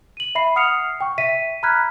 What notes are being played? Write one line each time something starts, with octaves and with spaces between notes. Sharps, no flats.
D#7 F#7
E5 B5 C7
F#5 D#6 F6 C7 C#7 F7
G5 C#6
E5 B6 D#7
A#5 B5 F6 F#6 G#6 B6